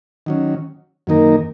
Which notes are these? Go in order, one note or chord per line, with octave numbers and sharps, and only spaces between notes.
D#3 F#3 C#4
F#2 D#3 A#3 D#4 A#4